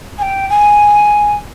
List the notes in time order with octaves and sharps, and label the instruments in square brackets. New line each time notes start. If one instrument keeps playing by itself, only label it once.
[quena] G#5
G5
G#5